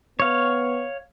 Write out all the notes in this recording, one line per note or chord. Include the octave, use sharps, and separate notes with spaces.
B3 C#5 F5